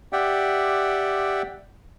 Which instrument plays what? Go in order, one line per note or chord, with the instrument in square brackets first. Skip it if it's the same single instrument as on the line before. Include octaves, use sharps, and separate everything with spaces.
[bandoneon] G4 D5 E5 F#5 G5